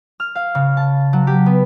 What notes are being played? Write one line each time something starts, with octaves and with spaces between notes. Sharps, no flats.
F6
F5
C#3
A5
F#3
G4
B3